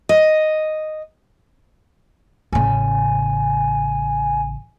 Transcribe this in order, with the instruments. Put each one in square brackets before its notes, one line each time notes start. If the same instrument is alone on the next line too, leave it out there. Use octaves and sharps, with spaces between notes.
[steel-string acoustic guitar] D#5
[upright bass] A1 C#3 [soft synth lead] G#5